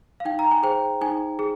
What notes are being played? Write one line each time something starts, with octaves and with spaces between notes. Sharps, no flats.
F5
D#4 G5
A#5
G#5
G#4 C5 G5
D#4 G#5
G#4